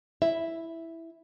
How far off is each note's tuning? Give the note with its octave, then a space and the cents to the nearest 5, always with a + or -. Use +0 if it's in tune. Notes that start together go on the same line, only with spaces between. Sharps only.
E4 +0 E5 +0